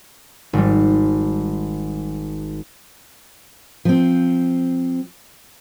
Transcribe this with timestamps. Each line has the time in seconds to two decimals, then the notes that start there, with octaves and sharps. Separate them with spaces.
0.53 G#1 G3
3.85 F3 C4